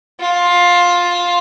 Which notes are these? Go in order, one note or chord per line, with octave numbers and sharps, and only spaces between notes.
F4